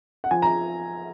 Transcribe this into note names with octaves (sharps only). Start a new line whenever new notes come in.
F#5
F3 G#5
F3 A#5